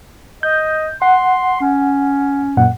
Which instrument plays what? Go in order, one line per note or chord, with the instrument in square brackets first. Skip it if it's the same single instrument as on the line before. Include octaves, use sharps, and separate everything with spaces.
[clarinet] D#5 [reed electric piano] G6
[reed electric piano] F#5 [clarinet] C6
[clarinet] C#4
[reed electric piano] F#2 A#2 F#5